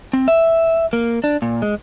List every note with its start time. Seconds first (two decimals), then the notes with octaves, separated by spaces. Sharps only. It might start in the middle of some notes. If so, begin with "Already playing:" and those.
0.13 C4
0.28 E5
0.93 A#3
1.24 D4
1.42 A#2
1.62 G#3